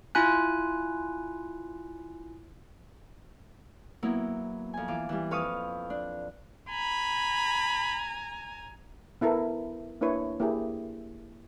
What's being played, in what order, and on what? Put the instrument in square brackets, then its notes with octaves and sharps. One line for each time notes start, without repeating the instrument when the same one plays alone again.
[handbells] E4 F4 G#5 F#6
[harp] F#3 A#3 B3 E4
F2 G#5
E3 F4 D6
E3 G3
F2 B4 F5 C#6 D#6
D4
[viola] G#5 A#5 [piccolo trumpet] B5
[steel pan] B3 E4 A4 A#4
A#3 D4 E4 B4 C#5
A#3 E4 G4 G#4